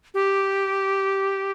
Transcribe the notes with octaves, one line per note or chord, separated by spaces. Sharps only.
G4